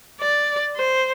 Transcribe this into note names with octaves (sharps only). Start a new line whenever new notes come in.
D5
C5